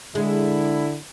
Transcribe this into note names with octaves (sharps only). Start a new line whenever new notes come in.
D3 G#3 E4